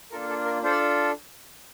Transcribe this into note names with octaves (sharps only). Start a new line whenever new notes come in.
A#3 D4 F4 A4 A#4
A4
A#4
D4 F4 A4 C5
D5